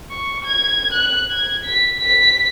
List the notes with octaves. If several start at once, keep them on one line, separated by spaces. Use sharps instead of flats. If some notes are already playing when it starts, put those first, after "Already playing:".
C#6
G#6
F#6
G#6
B6
B6